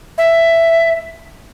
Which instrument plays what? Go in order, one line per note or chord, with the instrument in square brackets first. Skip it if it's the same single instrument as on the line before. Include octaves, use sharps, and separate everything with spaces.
[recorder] E5